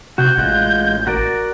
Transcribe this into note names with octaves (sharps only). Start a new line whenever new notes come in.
C3 F#4 G6
A1 G#3 F4 F#5
F#4 A#4 D5